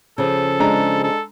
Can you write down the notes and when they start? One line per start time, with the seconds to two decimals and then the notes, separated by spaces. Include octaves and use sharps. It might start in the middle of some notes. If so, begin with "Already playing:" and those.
0.18 C#3 F3 A4
0.60 G#3 D4 A#5
1.04 A4